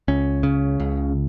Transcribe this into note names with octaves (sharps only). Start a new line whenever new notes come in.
C#2 C#4
C#3
C#2